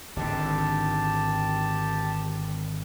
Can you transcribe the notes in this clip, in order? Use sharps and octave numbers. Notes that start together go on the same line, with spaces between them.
G#1 G#2 D3 G4 A5